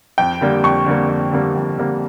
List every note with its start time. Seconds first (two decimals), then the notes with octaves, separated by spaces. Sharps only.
0.18 F2 G5
0.41 D3 G3 A#3
0.63 F2 C#6
0.86 D3 G3 A#3
1.08 F2
1.31 D3 G3 A#3
1.55 F2
1.78 D3 G3 A#3